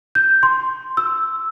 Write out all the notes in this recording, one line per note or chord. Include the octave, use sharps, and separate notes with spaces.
G6
C6
E6